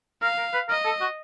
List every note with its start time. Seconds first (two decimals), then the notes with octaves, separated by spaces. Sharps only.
0.22 A#4 F5
0.38 A#4
0.54 B4
0.69 A#4 D#5
0.85 A4
1.01 F#4